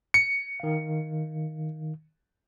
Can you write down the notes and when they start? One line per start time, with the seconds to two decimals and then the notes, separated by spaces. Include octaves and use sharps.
0.14 C#7
0.60 D#3 F5